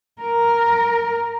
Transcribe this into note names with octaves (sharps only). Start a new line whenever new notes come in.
A#4